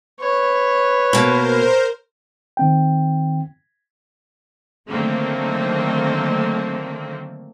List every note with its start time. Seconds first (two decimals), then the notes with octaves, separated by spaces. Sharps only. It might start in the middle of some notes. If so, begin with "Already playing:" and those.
0.21 B4 C#5
1.13 B2 A#3 A#4 C5
2.57 D#3 C4 G5
4.88 D3 D#3 F#3 A3 A#3 C4